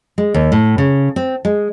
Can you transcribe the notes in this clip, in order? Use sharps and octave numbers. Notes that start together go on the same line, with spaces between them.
G#3
D#2
A2
C#3
C4
G#3